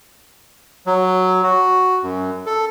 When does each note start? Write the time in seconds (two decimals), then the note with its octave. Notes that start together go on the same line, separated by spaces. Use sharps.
0.87 F#3
1.43 F#4
2.03 F#2
2.46 A4